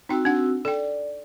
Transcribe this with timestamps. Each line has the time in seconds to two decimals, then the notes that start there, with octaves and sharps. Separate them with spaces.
0.09 C4 D#4 F#4 G5 E6
0.25 D4 F#5
0.65 A4 D5 G5